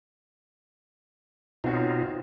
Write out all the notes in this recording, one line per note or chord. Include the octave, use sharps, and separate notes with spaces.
B2 C4 D#4 F4 F#4 C#5